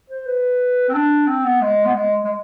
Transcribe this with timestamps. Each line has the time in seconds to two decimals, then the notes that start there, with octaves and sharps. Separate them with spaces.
0.10 C5
0.26 B4
0.89 C4
0.94 D4
1.27 C4
1.44 B3
1.61 G#3
1.85 B3
1.94 G#3
2.25 G#3